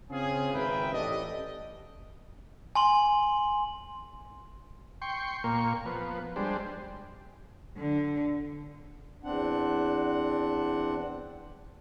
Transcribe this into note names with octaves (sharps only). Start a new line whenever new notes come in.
C#3 C4 C#4 F4 G#4
G#1 C#2 A#4 B4 E5 G5
A1 G4 A4 D5 D#5
G#5 C6 F#7
G5 C6 C#6
A#2 A#3 C#6
F3 B3
G3 G#3 D4 C5
D3
E2 C4 D4 F#5